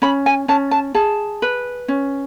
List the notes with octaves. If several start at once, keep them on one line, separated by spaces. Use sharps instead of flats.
C#4 B5
G#5
C#4 A5
A5
G#4 A5
B4
C#4